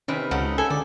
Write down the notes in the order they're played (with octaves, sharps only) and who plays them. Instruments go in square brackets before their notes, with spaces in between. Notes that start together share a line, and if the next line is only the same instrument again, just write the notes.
[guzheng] C3 D#3 B4 [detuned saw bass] C#4
[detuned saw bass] C#2 [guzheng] C#3 D#4 [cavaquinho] A4 F#5
[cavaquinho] A4 G#5
[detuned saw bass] D3 [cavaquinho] D5